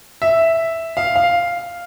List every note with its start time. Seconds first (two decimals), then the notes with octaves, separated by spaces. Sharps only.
0.22 E5
0.97 F5
1.16 F5